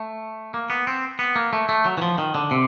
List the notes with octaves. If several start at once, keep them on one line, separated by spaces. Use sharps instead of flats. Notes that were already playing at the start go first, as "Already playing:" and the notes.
Already playing: A3
A#3
B3
C4
B3
A#3
A3
A3
F#3
E3
F3
D#3
D3
C3